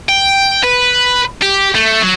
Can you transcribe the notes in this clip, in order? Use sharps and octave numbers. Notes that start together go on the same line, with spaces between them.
G5
B4
G4
A3
F#3